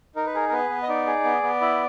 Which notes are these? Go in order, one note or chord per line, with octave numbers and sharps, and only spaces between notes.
D#4 A#4
B4
G#4 A#4
A#4
B3 B4
B3
D#5
D#4 D5
G#4
B3
B3
E4